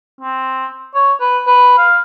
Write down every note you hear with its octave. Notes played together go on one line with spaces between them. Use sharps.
C4
C#5
B4
B4
F5